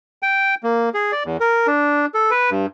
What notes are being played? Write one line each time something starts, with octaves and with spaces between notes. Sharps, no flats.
G5
A#3
G#4
D5
E2
A#4
D4
A4
B4
G2